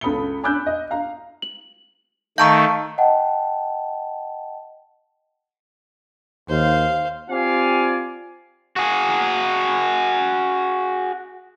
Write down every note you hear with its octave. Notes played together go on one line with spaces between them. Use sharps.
C#2 A4 B5 D#6 C#7 G7
G#5 B5 D6 E6 F#6 G6
D#5
F5 A#5
F#7
D#3 A3 F5 A5 A#5 C#6 G6
D#5 F#5 G5 A5
D#2 C5 F5
C4 F4 G4 D5 F5 G#5
F#4 G#4